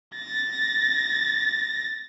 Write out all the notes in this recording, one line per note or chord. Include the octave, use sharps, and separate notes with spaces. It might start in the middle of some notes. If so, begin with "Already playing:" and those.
A6 A#6